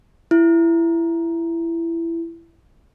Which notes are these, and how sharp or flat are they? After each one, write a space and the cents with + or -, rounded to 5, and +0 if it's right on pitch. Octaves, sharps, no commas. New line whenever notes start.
E4 +20